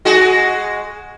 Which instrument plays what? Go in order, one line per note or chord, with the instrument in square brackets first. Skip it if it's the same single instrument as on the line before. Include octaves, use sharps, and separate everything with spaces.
[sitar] G#3 F#4